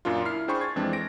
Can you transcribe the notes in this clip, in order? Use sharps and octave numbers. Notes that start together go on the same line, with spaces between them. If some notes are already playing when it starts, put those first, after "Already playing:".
F#2 A#2 A#3 D4 F4
E4 F6 C7
D4 G#4 C5 G5 B5 C#6
G#6 A6
F2 E3 F3 G#3 C4 D4
A#6 D7